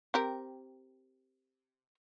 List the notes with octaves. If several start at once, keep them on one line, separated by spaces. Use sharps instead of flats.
C4 G4 A#4